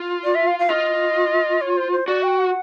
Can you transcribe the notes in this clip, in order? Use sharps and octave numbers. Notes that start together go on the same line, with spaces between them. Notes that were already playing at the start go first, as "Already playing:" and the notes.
Already playing: F4
D5
E5
F5
F5
F4 D#5
C#5
C5
C5
F#4 D5
G5
F#5